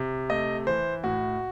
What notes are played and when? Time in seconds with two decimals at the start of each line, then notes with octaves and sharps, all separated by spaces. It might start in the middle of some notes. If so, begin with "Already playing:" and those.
Already playing: C3
0.30 A3 D#5
0.67 E3 C5
1.04 A2 F#4